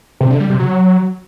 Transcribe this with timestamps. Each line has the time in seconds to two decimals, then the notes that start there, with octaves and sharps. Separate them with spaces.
0.21 C3
0.30 D3
0.40 G3
0.50 C3
0.59 F#3